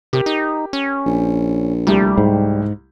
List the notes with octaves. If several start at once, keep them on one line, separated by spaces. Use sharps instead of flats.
C3 G4 A#4
D#4
C#4
A#1
C2 G3 A3 G4
G#2